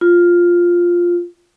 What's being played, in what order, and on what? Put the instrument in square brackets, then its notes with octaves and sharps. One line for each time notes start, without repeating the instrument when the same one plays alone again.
[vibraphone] F4